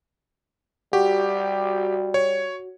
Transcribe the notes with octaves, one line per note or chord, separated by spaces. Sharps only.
G3 F#4 G4
C#5